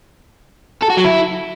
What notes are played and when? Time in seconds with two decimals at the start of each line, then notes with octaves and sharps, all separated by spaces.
0.82 A4
0.90 F#4
0.97 F#3
1.05 E4